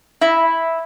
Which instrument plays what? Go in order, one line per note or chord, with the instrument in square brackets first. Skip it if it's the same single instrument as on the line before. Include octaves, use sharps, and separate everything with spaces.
[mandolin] E4 [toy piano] E5